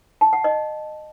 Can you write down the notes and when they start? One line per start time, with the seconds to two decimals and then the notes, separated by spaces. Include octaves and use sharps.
0.21 A5
0.33 F#5
0.44 D#5